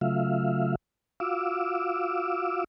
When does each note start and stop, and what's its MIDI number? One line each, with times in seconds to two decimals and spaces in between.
0.01 0.75 49
0.01 0.75 54
0.01 0.75 57
0.01 0.75 65
0.01 0.75 76
0.01 0.75 77
1.20 2.64 65
1.20 2.64 66
1.20 2.64 77
1.20 2.64 86
1.20 2.64 88